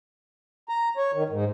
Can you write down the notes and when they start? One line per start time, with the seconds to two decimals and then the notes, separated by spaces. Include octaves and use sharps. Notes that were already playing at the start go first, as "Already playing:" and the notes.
0.69 A#5
0.97 C#5
1.13 D#3
1.30 G#2